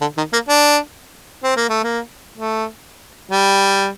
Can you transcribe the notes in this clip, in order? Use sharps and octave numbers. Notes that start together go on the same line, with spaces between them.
D3
D#3
A#3
D4
C4
A#3
A3
A#3
A3
G3